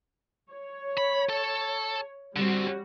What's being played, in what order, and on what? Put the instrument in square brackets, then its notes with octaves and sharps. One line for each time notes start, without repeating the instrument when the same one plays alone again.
[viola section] C#5
[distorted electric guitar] B5
A4
[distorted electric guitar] D3 C4 [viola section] G3 F#4